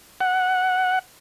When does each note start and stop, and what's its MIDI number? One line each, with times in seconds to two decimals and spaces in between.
0.21 0.99 78